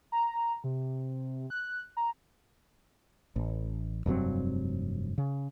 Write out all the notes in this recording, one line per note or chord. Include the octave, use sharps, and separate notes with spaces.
A#5
C3
F#6
A#5
A1
F1 G2 F#3 C4
C#3